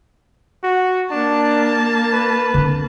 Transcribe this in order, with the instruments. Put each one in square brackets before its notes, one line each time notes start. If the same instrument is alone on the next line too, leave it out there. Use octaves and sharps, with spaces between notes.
[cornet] F#4
[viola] A#3 A5 [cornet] D4
[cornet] B4
[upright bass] D3 C4